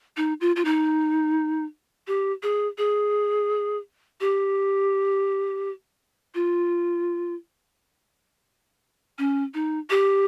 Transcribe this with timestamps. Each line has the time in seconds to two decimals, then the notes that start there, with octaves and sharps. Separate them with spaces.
0.17 D#4
0.41 F4
0.56 F4
0.65 D#4
2.07 G4
2.43 G#4
2.78 G#4
4.21 G4
6.35 F4
9.19 C#4
9.54 D#4
9.90 G4